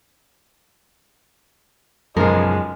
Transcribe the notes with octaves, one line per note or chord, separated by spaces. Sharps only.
B1 F#2 C#3 F3 G#3 G#4 A#4